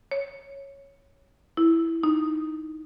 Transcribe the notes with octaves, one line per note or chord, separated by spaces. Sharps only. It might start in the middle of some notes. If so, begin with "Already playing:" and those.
C#5
E4
D#4